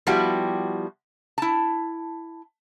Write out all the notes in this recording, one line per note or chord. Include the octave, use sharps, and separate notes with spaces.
F3 G3 B3 E4 F#4 G4
E4 A5